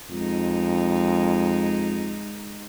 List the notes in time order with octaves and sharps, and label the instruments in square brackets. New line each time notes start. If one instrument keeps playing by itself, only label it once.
[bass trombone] F2 [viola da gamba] G#3 D#4